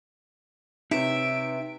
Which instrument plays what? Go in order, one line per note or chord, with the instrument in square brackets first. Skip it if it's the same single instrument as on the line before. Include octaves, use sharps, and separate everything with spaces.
[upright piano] C3 [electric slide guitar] D#4 B4 C#5 [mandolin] E5 [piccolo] D7